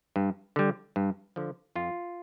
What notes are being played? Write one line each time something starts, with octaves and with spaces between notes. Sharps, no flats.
G2
D3 G3
G2
D3 F3
F2 F4